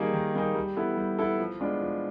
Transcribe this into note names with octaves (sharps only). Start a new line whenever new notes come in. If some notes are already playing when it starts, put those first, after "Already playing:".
Already playing: D#3 G3 A#3 D#4 G#4
D#3
G3 A#3 D#4 G#4
G3
B3 E4 A4
G3
B3 E4 A4
F3
G#3 B3 D4 F4
F3